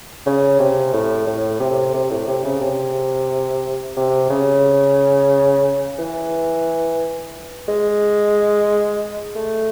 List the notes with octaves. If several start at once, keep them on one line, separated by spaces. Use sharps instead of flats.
C#3
C3
A2
A2
C3
C3
A2
C3
C#3
C3
C3
C#3
E3
G#3
A3